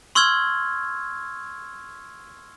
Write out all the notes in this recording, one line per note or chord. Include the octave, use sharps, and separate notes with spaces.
C6 C#6 E6 F6 G#6